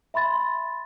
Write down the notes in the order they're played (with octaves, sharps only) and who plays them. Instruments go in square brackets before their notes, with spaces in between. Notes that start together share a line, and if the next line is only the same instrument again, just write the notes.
[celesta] E5 B5 C6 A6